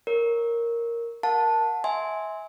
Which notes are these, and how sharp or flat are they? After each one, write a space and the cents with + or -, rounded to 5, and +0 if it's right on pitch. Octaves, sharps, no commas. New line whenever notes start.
A#4 +0 C#5 +0
A#4 +10 F#5 -35 A5 +0
E5 -30 G#5 +0 C6 +0